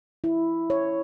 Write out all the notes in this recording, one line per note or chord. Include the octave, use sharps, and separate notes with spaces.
E4
C#5